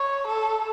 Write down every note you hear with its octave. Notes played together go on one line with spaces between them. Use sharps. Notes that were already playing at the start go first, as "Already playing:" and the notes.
Already playing: C#5
A4